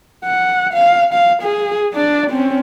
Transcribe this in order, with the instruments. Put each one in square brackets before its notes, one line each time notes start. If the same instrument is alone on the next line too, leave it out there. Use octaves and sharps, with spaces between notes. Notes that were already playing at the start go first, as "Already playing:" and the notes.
[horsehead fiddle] F#5
F5
F5
G#4
D4 D5
C4 C#4